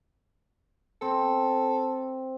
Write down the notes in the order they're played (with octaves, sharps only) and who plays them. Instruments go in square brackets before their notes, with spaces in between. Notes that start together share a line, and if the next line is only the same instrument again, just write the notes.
[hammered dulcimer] C4 [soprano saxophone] A4